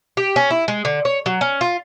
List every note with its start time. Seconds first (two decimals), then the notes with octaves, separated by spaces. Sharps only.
0.17 G4
0.36 C#4
0.50 E4
0.68 G#3
0.85 D3
1.05 C#5
1.26 F#3
1.41 C#4
1.61 F4